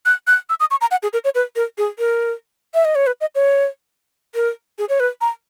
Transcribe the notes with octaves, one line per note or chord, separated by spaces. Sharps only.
F#6
F#6
E6
D#6
C#6
A#5
F#5
G#4
A#4
C#5
B4
A#4
G#4
A#4
E5
D#5
C#5
B4
D#5
C#5
A#4
G#4
C#5
B4
A#5